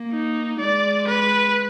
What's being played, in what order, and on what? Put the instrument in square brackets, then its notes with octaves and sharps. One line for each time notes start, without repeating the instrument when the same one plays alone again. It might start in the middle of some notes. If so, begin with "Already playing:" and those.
Already playing: [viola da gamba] A#3
[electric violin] D#4
[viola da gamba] G#3 [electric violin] D5
[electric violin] B4